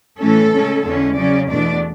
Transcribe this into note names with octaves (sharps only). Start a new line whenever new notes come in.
A2 E3 A3 C#4 A4
C#3 G#3 C#4
E2 D3 G#3 C#4
C#3 F#3 C#4 D5
E2 B2 A3 D4 D5